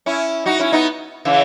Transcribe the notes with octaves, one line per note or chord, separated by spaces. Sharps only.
C#4 E4
D#4 F#4
C#4 E4
B3 D#4
C#3 E3